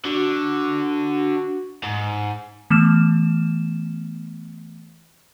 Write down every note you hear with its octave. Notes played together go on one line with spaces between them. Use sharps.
D3 F#4
G#2
E3 A3 B3 F6 E7